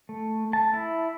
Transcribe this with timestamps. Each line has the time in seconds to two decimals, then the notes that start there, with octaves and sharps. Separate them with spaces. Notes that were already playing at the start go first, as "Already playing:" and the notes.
0.09 A3
0.53 A5
0.73 E4